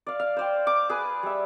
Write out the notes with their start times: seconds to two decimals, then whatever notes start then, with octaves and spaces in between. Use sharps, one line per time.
0.07 D5 F5
0.20 F5
0.36 C5 D5 G5
0.67 D6
0.90 G#4 B4
1.23 G3 E5